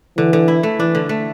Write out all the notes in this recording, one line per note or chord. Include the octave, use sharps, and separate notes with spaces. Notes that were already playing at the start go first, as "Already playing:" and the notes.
D3 E3
D3
E4
A3
E3 D4
D3
A3